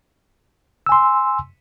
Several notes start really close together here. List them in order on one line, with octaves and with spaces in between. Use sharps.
E6 G#5 C6